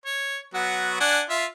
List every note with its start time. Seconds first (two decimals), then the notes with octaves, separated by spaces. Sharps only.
0.06 C#5
0.54 F#3 B3 F#4
1.00 D4 F#5 G#5
1.30 F4 E5